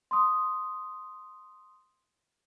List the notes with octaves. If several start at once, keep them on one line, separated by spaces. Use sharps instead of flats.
C6 D#6